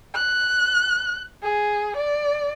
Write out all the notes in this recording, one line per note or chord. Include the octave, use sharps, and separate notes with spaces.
F#6
G#4
D5